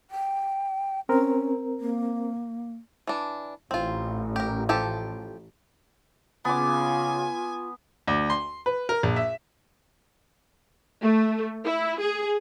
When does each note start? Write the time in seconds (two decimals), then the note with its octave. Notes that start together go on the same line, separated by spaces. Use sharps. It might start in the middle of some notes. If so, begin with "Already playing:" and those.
0.11 G5
1.09 C4 C#4 A#4
1.81 A#3
3.07 E3 D4
3.71 A1 C4 F4
4.36 G4 A#4
4.69 F3 G4 A4
6.45 C#3 B3 F4 G#5 D6
8.07 D2
8.30 C6
8.66 B4
8.89 A#4
9.03 A#1
9.16 E5
11.02 A3
11.65 E4
12.00 G#4